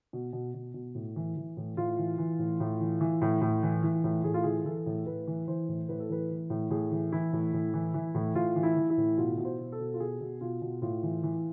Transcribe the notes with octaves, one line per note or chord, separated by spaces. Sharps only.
B2
B2
B2
B2
A2
E3
E3
A2
A2 F4
E3
E3
A2
A2
E3
E3
A2
A2
E3
E3
A2
A2 G#4
F4
E3 G#4
E3 A4
A2
A2 B4
E3
E3 C5
A2
A2 B4
A4
E3 B4
E3
A2
A2 G#4
E3
E3 E4
A2
A2
E3
E3
A2
A2 F4
E3
E4
E3
E4
A2
B2 F4
B2
C5
B2
A4
B2
F4
B2 G#4
B2
B2 F4
B2
A2 F4
E3
E3